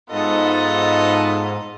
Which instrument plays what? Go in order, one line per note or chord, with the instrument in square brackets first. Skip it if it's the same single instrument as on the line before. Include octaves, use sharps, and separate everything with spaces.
[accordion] G#2 [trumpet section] B3 A4 A5 [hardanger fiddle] F4 D#5